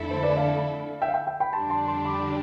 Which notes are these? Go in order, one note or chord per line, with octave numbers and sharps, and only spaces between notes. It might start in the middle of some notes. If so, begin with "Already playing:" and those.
Already playing: F2 D3 A3 E4 A4
C5
B4 D5
D5 F5
E5 G5
F5
E5 G5
E5 G5
G5 B5
F2 D3 G3 D4 G4 A5 C6
A5 C6
A5 C6
B5 D6